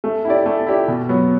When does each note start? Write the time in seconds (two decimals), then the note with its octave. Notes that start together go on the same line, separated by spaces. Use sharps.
0.04 A3
0.25 E4 G4 D5
0.46 A3
0.67 E4 G4 D5
0.88 B2
1.09 F#3 B3